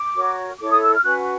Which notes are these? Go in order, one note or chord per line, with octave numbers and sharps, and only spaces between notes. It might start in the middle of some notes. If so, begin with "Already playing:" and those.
Already playing: D6
F#4 A#4 C#5
E4 A4 C#5 D6
D#6
E6
F6
C#4 F#4 B4 F#6